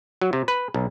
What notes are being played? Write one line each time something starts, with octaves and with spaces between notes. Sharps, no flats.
F#3
C3
B4
B1